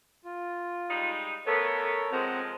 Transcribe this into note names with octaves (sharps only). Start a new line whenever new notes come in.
F4
G3 G#3 D#4
A3 B3 A4 A#4 C#5
F3 G#3 C4 F#5 A#5